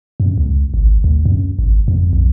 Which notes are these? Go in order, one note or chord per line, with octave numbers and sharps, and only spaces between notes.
F#2
C#2
G#1
D2
F#2
G#1
F2
A#1